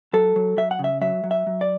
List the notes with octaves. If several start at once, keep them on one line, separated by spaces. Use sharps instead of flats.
F#3 A4
F#3
F#3 E5
F#5
C#3
E5
F#3 E5
F#3
E5
F#3
D5